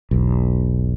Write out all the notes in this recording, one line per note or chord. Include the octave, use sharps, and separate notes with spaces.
E1 B1